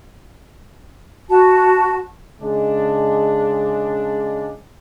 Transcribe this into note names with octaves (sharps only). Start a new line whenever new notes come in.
F#4 A5
C#3 G#3 D4